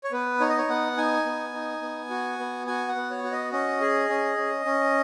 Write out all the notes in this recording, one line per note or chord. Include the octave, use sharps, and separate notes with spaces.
C#5
B3 B4
D#4 C#5
D#5
C#5
B3 F#5
D#4 G#5
B3
D#4
B3
F#4
B3
F#4 G#5
F#5
B3
C#5
F#4
D#5
C#4 D#5
G#4
C#4
C#4
C#4